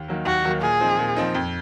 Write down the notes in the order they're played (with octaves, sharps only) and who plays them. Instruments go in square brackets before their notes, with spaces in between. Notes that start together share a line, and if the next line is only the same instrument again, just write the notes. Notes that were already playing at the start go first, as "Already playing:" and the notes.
Already playing: [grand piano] D#2
D#3 F#3 A#3
[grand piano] D#2 [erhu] F#4
[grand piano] D#3 F#3 A#3
[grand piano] A#2 [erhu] G#4
[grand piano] F3 C4 D#4
A#2
F3 C4 D#4
F2